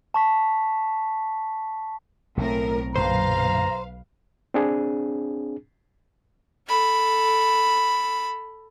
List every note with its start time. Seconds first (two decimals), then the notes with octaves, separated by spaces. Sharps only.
0.14 A5 C#6 B6
2.37 B1 A2 C4 A#4
2.96 B1 F#2 A#2 D3 B4 C5 F5 A#5
4.54 C4 D4 G#4
6.68 A4 B5